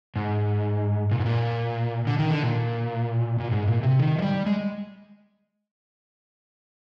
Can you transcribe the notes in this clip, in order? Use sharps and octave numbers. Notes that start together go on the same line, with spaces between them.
G#2
A#2
G#2
A#2
D3
D#3
D3
A#2
A#2
G#2
A#2
C3
D#3
F3
G3
G#3